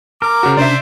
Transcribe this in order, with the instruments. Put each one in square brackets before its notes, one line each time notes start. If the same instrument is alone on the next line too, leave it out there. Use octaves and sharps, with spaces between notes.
[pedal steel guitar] A#4 [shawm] D6
[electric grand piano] C#3 F#4
[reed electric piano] C3 C#4 D4 [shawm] C5 [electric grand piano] D5 E5